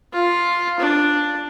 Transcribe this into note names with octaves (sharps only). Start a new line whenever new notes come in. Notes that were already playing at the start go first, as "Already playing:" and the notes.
F4
D4